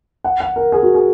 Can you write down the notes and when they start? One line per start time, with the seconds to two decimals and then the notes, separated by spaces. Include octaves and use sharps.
0.24 F#5
0.40 F#5
0.56 A#4
0.72 G#4
0.83 F#4
0.95 G#4